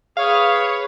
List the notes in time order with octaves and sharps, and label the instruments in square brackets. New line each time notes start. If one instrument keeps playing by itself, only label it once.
[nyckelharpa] G#4 B4 [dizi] C#5 [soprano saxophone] F5